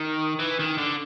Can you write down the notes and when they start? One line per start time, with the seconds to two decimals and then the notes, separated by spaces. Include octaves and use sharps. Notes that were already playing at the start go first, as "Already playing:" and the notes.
Already playing: D#3
0.39 E3
0.59 D#3
0.78 D3